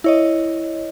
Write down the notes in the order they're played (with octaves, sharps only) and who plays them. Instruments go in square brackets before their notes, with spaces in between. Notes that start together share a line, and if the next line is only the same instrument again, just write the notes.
[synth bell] E4 C#5 D#5